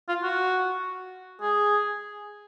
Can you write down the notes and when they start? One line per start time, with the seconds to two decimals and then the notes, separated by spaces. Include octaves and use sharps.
0.09 F4
0.23 F#4
1.41 G#4